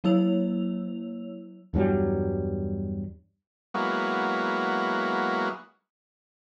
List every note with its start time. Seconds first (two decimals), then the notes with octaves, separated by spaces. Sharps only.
0.04 F#3 A#3 E4 C#5 E6 F7
1.74 E2 G2 F#3 G3
3.74 F#3 G#3 A#3 B3 E4 F#4